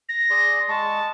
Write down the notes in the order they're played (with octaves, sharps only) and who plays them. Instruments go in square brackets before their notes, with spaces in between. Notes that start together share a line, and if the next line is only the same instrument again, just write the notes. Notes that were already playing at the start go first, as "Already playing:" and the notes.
[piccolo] A#6
[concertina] G#4 D5 C6
[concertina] G#3 C#6 [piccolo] A5